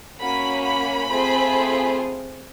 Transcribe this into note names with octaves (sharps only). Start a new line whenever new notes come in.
A#3 C#4 F#4 B5
B5
A3 C4 F4 G#4